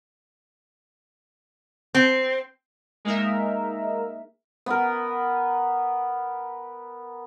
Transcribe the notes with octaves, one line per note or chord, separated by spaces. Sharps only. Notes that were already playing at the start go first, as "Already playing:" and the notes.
C4
G#3 A#3 D#4 A#4 E5
B3 A#4